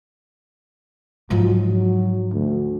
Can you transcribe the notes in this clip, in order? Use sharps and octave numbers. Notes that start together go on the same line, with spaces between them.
G#2 F3 F#3
F#3
D2